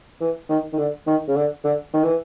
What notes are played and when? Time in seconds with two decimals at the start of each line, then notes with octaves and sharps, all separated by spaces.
0.21 E3
0.49 D#3
0.73 D#3
0.78 D3
1.07 D#3
1.28 C#3
1.36 D3
1.64 D3
1.93 D#3
2.04 E3